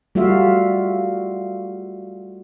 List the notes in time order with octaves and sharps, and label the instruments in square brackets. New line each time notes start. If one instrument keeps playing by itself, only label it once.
[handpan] G3 A3 F4 F#4 E5 F5